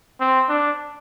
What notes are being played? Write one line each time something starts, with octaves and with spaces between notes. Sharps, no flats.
C4
D4